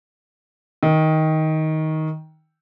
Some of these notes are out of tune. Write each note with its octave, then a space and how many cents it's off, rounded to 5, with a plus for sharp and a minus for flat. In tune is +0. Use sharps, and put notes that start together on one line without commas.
D#3 +15